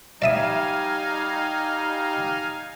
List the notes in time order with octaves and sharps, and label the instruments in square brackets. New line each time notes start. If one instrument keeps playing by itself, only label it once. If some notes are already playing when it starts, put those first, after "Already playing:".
[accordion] G3 [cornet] D#4 [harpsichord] D5 E5 D#6 [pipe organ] F5 G#5